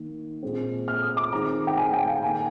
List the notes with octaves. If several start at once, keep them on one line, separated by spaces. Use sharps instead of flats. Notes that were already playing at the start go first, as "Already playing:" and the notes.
Already playing: D#3 A#3
A#2 G#3 C4
F6
D#6
D6
D#3 G#3 C4 A#5
G5
G#5
G5
F5
D#3 A#3 G#5